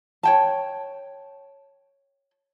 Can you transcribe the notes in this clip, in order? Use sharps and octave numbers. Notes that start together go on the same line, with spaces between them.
C#5 G5 A5